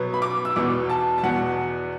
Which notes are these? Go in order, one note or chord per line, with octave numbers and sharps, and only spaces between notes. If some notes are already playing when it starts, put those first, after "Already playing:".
Already playing: B2 F#3 B3
B5
D6
E6
E2 B2 B3 D6
A5
A5
E2 B2 B3 F#5